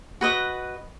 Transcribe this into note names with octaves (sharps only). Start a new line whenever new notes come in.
F#4 B4 D#5